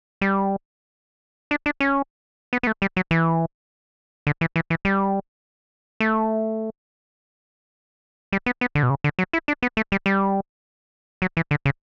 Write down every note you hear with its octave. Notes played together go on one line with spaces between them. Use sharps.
G3
D4
D4
C#4
B3
B3
A3
G3
F#3
E3
D3
E3
E3
E3
G3
A3
G3
B3
B3
D3
B2
C#3
D3
F#3
E4
D4
B3
A3
G3
G3
F#3
E3
D3
C#3